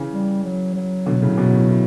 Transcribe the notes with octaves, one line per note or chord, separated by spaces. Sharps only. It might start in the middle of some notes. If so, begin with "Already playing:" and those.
Already playing: C#3 E3
G3
F#3
F#3
B2 D3
A2 C#3
B2
A2
A2